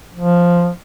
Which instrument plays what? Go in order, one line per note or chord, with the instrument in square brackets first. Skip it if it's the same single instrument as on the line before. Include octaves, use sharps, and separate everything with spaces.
[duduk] F3